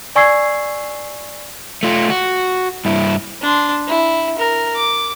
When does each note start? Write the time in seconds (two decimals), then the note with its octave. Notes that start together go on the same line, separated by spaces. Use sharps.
0.15 D5 G#5 C#6 E6 G#6 C7
1.83 A3 F4
2.10 F#4
2.85 G2 E4
3.42 D4 C6
3.88 E4
4.38 A#4
4.76 D6